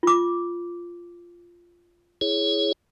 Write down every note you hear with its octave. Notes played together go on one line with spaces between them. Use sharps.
F4 D6
E4 G#4 C#5